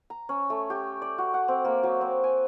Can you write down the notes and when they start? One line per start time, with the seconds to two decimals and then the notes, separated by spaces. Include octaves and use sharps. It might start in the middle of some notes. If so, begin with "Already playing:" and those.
0.10 A#5
0.29 C#4
0.50 A3
0.70 G4
1.02 D5
1.18 F#4
1.34 F#5
1.48 C4
1.65 A#3
1.83 F#3
2.01 C4
2.24 G#5